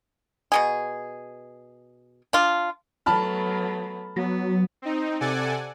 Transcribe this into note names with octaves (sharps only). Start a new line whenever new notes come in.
B2 F#3 G#4
D4 F4
F#3 A3 B3 A5 B5 F6
F#3 B3
C4 D#4
C3 A4 D5 F#5 G#5